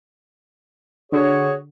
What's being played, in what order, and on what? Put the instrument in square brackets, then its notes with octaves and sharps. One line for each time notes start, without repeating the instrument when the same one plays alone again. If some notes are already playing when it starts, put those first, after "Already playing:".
[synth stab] D3 [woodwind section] F#4 G#4 C#5